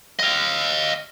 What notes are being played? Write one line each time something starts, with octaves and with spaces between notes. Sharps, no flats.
D#5 F5